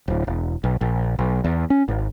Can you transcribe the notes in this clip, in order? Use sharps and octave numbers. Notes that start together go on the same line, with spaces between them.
D1
E1
B1
A#1
B1
E2
C#4
G#1